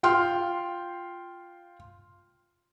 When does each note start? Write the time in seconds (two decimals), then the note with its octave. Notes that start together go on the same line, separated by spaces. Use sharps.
0.03 F4 G5 C6 F6